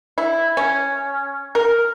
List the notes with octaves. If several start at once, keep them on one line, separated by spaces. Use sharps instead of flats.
E4
C#4
A#4